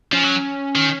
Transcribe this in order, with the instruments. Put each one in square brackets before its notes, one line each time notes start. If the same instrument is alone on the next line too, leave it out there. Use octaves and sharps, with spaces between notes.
[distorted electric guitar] F3 [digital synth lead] C#4
[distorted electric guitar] F#3
D#3